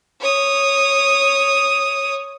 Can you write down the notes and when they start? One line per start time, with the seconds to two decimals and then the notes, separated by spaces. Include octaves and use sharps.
0.21 C#5 D#6